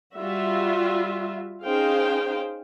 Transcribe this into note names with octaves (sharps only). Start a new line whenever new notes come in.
G3 F4 F#4 E5
C#4 D#4 G#4 C5 F5 G5